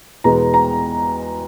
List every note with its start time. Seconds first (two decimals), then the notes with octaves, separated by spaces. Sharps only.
0.24 E2 B2 G#3 B3 A#5
0.54 A#5